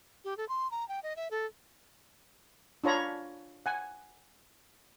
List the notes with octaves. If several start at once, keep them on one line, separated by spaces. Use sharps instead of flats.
G4
A4
C6
A#5
G5
D#5
E5
A4
D4 F4 C#5 A#5 B5
F#5 G#5